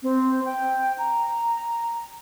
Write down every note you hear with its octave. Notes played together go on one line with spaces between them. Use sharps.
C4
G5
A#5